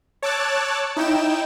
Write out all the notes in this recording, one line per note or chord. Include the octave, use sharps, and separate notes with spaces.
C#5 A5 D6 E6 F#6 A6
D#4 E4 G5 E7